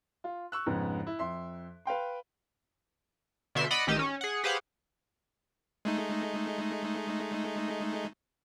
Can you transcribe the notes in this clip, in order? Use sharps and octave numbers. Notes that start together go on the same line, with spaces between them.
F4
C#6 E6 F#6
F2 G#2 C#3 B3
E4
F2 E5 C6
B4 F5 G5 C6
B2 D3 E5 C6
D5 D#5 F#5 B5
A1 D#3 G4 D#5 E6
C#4
G#4 F#5
G4 G#4 B4 C5 F5 F#5
G#3 A3 D#4